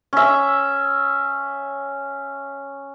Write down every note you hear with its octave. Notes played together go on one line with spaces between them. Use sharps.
C#4 E5